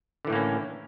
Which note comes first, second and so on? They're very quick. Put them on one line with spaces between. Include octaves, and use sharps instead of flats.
D3 E3 A2 A#3 C#4